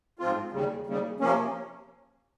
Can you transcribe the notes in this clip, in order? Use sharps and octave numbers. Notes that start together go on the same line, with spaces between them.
G#2 F3 C4 F4
D#2 C#3 G3
D#2 C#3 G3
C3 F3 A#3 C#4